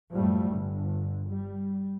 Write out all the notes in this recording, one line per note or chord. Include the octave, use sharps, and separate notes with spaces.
F#2 A2 F3 G3 A3
G1 D3
G3